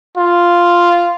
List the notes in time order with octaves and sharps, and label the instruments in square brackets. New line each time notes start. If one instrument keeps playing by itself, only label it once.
[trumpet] F4